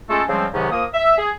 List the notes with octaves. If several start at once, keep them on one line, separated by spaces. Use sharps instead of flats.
G#3 A3 C#4 F4 A4
C#3 F3 G3 G#3 C4
G#2 C3 D#3 F#3 B3 C#4
F3 A#3 A#4 D#6
E5
G#4